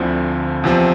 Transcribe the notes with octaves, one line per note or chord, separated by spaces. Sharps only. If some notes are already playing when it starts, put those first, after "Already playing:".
Already playing: D2 D3 F3 C4 E4
E2 C3 F3 C4